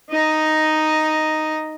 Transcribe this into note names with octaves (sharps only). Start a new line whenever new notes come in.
D#4 D#5